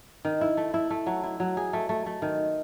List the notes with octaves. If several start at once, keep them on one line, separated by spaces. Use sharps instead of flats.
D#3
E4
A3
E4
A3
F#3
E4
F#3
G#4
A3
A3
A3
D#3